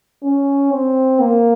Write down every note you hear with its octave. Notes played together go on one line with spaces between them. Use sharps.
C#4
C4
A#3